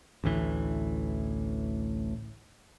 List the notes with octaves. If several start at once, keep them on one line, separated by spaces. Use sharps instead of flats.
A1 D2 A2 E3